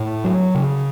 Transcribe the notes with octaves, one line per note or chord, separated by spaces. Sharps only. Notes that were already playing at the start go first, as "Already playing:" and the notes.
Already playing: A2
F#3
C#3